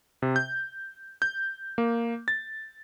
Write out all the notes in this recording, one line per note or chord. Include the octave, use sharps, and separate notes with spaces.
C3
G6
G6
A#3
A6